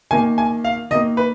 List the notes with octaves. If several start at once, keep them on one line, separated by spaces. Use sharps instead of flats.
D#3 A#3 G#5
G#5
F5
D#3 A#3 D#5
B4